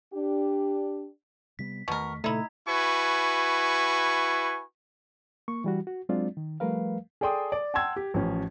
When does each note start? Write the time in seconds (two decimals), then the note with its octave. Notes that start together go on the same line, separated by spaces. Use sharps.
0.14 D4 G4
1.59 C3 G3 B3 B6
1.88 E2 B2 D#3 A3 A#4 C#6
2.24 A#2 C#3 A3 D#4 E4 A#5 G#6
2.68 E4 F#4 B4 G#5 C#6
5.48 A#3 C#6
5.64 E3 G3 F#4
5.87 F#4
6.09 F#3 G#3 C4 D4 F4 D5
6.37 D#3
6.60 F3 G3 A3 A#4 B4 F5
7.21 G#4 A4 D5 G5 C6 D#6
7.52 D5
7.74 F#5 G5 A5 C6 E6 G#6
7.96 G4
8.14 A1 F3 C#4